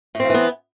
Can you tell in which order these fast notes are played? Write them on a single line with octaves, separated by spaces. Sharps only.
A2 C4 F3 E3 B3